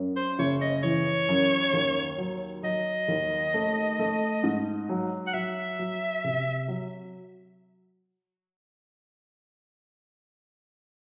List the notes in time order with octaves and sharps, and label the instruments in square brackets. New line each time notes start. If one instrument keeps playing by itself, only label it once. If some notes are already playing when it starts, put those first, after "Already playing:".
Already playing: [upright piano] F#2
[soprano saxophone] C5
[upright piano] F#1 [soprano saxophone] C#5
[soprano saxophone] D#5
[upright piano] E3 [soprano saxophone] C#5
[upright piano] F#2
D#2
F#3
[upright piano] F#3 [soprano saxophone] D#5
[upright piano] D#2
A3
A3
G#2
F#3
[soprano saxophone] F#5
[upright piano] F#3 [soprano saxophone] E5
[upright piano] F#3
C3
F#3